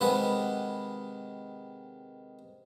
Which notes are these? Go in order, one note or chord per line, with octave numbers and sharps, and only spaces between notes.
C3 D#3 G#3 B4 F#5 B5